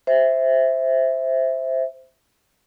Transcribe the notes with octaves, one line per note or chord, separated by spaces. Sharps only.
C5 E5